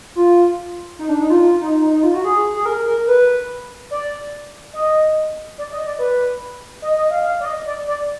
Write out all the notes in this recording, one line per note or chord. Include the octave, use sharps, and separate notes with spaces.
F4
D#4
D4
D#4
F4
F4
D#4
D#4
D#4
F4
F#4
G#4
G#4
A#4
A#4
B4
D5
D#5
D5
D#5
D5
B4
D#5
D#5
F5
F5
D5
D#5
D5
D5